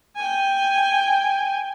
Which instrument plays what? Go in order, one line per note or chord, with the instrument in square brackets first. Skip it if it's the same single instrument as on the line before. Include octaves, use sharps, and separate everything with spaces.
[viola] G5 G#5